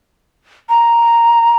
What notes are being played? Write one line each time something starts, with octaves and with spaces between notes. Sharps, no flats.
A#5